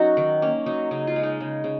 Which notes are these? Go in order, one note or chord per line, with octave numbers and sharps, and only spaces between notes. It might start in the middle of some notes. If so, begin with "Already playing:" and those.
Already playing: F#3 C#4 D#4 F#4
D#3
A#3 C#4
F#3 D#4
C#3 D#4
F4
G#3
D#4
C#3
C#3